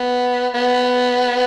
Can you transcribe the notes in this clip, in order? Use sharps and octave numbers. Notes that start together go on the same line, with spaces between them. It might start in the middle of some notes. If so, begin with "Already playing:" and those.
Already playing: B3
B3